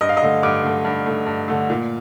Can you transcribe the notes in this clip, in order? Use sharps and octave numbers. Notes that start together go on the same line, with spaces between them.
G2 D#5
F5
D#5
D3 A3
G2 D6
D3 A3
G2
D3 A3
G2
D3 A3
A#2